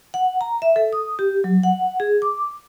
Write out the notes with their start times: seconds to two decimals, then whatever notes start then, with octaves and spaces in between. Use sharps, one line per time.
0.14 F#5
0.41 A#5
0.62 E5
0.76 A4
0.93 D#6
1.19 G4
1.44 F#3
1.63 F#5
2.00 G#4
2.22 D6